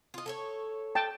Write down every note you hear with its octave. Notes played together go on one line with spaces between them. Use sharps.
F4 D#5
A4 B4 C#5
G5 A5